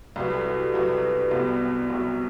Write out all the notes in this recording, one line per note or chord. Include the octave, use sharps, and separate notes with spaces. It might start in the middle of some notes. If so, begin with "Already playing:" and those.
C2 C3 F#3 G4 B4
F#4 A4
E4 G4
F#4 A4
C2 C3 F#3 G4 B4
G4 B4
G4 B4
C4
C2 C3 F#3 B3
C2 C3 F#3